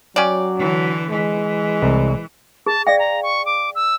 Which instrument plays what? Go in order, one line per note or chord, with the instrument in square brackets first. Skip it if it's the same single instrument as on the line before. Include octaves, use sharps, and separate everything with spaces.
[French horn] F#3 [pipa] C#4 D5 [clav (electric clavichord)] F#5 G5
[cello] D3 E3
[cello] E3 [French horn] G#3
[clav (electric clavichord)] C2
[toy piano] G#4 [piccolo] A5
[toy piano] D5 F5 G5 [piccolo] A#6
[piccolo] A#5
C#6
D6
E6